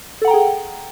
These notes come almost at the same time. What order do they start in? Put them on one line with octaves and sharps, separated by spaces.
A4 F#5 A#5 G5 G#4